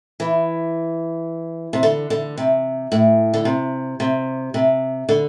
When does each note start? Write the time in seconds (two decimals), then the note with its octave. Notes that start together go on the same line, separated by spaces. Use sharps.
0.20 E3
1.73 C3
1.83 D3
2.10 D3
2.38 C3
2.92 A2
3.34 D3
3.45 C3
4.00 C3
4.54 C3
5.09 D3